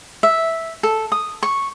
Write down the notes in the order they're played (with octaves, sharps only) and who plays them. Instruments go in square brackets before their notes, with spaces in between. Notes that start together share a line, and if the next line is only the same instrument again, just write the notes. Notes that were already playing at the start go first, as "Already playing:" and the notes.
[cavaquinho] E5
A4
D#6
C#6